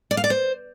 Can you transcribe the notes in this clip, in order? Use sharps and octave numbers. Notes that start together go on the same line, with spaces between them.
D5
F5
D5
C5